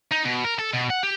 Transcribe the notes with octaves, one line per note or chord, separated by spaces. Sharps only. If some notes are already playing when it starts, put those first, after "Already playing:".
D#4
B2
A#4
A4
B2
F#5
G4